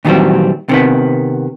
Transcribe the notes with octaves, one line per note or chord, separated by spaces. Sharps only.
A#2 D#3 E3 F#3 G3 C4
C3 D#3 B3